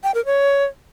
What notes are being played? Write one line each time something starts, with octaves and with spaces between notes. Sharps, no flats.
G5
A#4
C#5